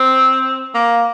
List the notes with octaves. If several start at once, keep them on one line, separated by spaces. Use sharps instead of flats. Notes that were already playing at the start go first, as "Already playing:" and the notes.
Already playing: C4
A#3